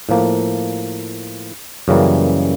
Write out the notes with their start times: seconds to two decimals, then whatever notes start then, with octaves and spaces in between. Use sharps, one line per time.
0.09 A2 F3 A#3
1.88 F#2 C#3 E3 G3 A#3